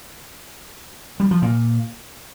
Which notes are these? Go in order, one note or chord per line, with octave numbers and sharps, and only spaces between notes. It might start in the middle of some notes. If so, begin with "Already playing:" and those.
G3
F3
A#2